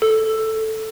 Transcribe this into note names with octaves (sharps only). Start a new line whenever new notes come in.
A4